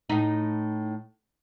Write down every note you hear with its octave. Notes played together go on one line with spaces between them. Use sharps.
A2 D#4